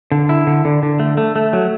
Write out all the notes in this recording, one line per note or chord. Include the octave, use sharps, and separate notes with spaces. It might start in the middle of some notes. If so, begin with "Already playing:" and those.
D3
E4
D3
D3
D3
A3
A3
A3
F#3